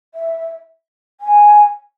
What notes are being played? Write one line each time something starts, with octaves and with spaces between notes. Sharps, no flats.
E5
G#5